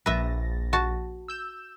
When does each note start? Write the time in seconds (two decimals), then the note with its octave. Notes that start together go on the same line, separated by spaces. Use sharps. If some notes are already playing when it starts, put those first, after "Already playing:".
0.06 A#1 B4 E5 A6 A#6
0.73 F#4 A5
1.28 E6 G6 E7